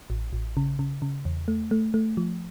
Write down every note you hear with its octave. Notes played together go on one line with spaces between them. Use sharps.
A1
A1
C#3
C#3
C#3
E2
A3
A3
A3
F3